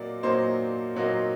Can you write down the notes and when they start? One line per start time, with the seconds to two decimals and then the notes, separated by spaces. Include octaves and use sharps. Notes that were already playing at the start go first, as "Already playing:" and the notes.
Already playing: A#2 F#3 A#3 D#4 D5
0.23 A#2 F#3 A#3 D#4 C5
0.95 A#2 F#3 A#3 D#4